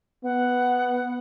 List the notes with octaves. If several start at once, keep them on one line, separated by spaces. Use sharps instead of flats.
B3 F#5